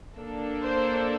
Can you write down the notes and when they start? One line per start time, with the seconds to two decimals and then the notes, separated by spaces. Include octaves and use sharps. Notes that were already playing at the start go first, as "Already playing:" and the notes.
0.16 A#3 D4 A4
0.63 C5